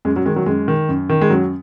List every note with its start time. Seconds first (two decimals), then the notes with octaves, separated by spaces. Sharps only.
0.05 F#2 G#3
0.16 F#3
0.26 D#3 G#3
0.36 F#3
0.46 F#2 G#3
0.68 D#3
0.89 F#2
1.09 D#3
1.21 G#3
1.30 F#2 F#3